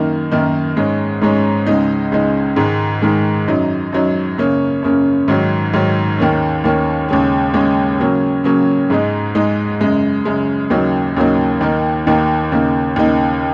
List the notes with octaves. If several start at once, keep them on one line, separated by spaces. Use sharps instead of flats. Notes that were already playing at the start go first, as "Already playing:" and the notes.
Already playing: F#2 D#3 A#3 D#4
F#2 D#3 A#3 D#4
G#2 G#3 C#4
G#2 G#3 C#4
C#2 C#3 G#3 D#4
C#2 C#3 G#3 D#4
G#2 D#3 G#3
G#2 D#3 G#3
F#2 F#3 D#4
F#2 F#3 D#4
F#2 C#3 A#3 C#4
F#2 C#3 A#3 C#4
G#2 D#3 F#3
G#2 D#3 F#3
D#2 D#3 A#3 C#4
D#2 D#3 A#3 C#4
D#2 C#3 G#3 C#4
D#2 C#3 G#3 C#4
C#3 F#3 A#3 C#4
C#3 F#3 A#3 C#4
G#2 G#3 D#4
G#2 G#3 D#4
F#2 C#3 G#3
F#2 C#3 G#3
D#2 C#3 F#3 A#3 D#4
D#2 C#3 F#3 A#3 D#4
D#2 D#3 A#3 D#4
D#2 D#3 A#3 D#4
D#2 C#3 A#3 D#4
D#2 C#3 A#3 D#4